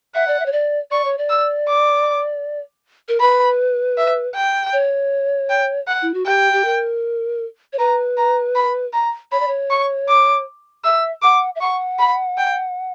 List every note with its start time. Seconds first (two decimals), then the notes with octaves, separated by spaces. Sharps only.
0.15 E5 F#5
0.28 D5
0.40 E5
0.46 C#5
0.52 D5
0.91 D5 C#6
1.05 C#5
1.18 D5
1.30 E6
1.68 D6
3.08 A#4
3.20 B4 B5
3.97 E5
4.35 G5
4.73 C#5
5.49 G5
5.87 F#5
6.02 E4
6.14 F#4
6.26 G4 G5
6.53 G4
6.65 A#4
7.73 C#5
7.79 B4 A#5
8.17 A#5
8.55 B5
8.93 A#5
9.32 C#5 B5
9.40 D5
9.48 C#5
9.70 C#6
10.09 D6
10.84 E5 E6
11.22 F#5 D6
11.56 E5
11.61 F#5 C#6
11.99 B5
12.38 G5